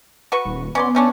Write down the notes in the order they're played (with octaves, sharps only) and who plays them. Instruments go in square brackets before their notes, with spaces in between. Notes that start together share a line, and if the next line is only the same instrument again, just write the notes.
[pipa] F#4 B4 C#6
[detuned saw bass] D#1
[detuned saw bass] B3 [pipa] C#4 D5 C6
[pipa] A3 C#4 D4